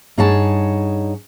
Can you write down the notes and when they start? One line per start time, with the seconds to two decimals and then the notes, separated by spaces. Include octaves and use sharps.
0.17 G2 D#4 G#4 C#5 F#5 A5